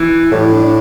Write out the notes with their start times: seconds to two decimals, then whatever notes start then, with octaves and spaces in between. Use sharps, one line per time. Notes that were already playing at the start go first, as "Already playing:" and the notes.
Already playing: E3
0.32 A2 G3
0.43 E3
0.52 D4
0.63 D4